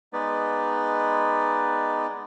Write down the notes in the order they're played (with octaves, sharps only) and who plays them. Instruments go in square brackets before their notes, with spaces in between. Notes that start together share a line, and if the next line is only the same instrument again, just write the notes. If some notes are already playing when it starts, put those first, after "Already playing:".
[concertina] G#3 B3 D#4 B4 D5